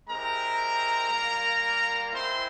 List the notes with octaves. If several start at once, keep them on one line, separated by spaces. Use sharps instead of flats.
G#3 C4 E4 G4 A#4 A#5
G3 A#3 F4
G#3 C4 E4 C5 C6